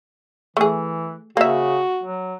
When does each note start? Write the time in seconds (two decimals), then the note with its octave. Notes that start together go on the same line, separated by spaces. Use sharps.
0.57 E3 A3 G#4
1.37 C#3 A#3 F#4 E5
2.03 F#3